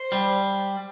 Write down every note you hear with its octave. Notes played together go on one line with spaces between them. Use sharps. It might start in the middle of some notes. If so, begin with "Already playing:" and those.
Already playing: C5
G3